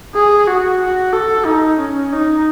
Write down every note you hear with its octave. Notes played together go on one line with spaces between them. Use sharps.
G#4
F#4
F#4
A4
D#4
C#4
D#4